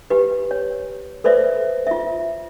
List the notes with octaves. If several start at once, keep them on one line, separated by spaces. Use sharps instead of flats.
G4 B4
C#5
A4 B4 C5 D5 E5
F4 E5